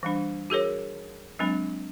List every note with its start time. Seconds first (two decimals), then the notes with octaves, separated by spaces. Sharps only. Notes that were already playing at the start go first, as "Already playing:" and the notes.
0.03 E3 G3 D4
0.50 F#4 G#4 A#4 C#5
1.39 F#3 G#3 C4 D4